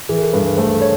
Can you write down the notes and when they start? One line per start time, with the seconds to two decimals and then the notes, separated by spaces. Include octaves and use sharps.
0.09 E3 G#4
0.17 A#4
0.21 A4
0.33 G2 B4
0.46 B4
0.57 A3 C5
0.82 C#5